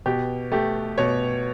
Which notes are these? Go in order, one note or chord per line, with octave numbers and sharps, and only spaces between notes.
B2 G4
A3 G4
B2 C#5